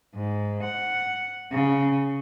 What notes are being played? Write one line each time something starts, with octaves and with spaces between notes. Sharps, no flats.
G#2
F#5
C#3